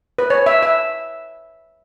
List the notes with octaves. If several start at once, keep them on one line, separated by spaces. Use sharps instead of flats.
B4
C#5
E5
E5